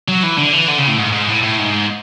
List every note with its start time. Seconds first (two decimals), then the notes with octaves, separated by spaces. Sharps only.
0.08 F#3
0.23 E3
0.38 D3
0.53 E3
0.68 D3
0.78 C#3
0.88 A2
0.98 G#2
1.12 G#2
1.28 A2
1.43 A2
1.58 G#2